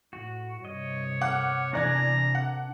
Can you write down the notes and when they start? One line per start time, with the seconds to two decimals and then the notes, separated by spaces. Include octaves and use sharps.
0.13 A2 F#4
0.65 G2 C3 C#5 D#5
1.21 F#5 D6 F6
1.73 E2 C3 D4 D5 A#5 F#6 G#6
2.35 F#5